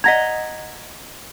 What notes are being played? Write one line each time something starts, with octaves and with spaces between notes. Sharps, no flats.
D#5 F#5 A#5 G#6 A#6 B6